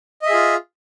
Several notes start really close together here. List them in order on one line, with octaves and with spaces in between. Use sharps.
D#5 E5 G#4 F4